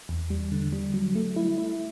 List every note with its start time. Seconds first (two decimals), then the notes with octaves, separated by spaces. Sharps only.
0.09 E2
0.30 G3
0.52 D3
0.72 G3
0.94 F#3
1.15 A3
1.36 E4
1.58 E4